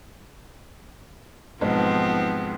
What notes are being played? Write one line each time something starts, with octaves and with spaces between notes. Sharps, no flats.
B1 G#2 F3 G#3 B3 C4